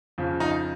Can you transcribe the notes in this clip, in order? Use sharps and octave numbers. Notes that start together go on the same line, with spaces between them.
F2 C#3 F3
D#4